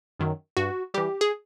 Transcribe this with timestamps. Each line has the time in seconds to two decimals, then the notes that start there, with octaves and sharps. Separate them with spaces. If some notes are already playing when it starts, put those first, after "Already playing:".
0.20 F#2 D#3 F#3
0.57 G2 F#4
0.94 E3 G3 G4
1.21 G#4